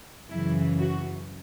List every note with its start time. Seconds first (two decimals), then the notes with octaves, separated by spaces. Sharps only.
0.31 F#2 C#3 E3 E4
0.79 F#4